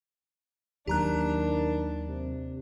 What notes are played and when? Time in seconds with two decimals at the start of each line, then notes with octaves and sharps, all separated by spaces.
0.87 D#2 D#3 F#3 A#3 D4 G4 A#5 F#6
2.08 C3